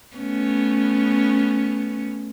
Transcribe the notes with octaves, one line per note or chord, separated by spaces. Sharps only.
A3 B3 C#4